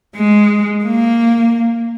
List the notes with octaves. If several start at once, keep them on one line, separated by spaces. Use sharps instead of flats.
G#3
A#3